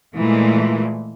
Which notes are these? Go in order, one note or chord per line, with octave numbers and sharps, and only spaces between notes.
A#2 E3 G#3 A3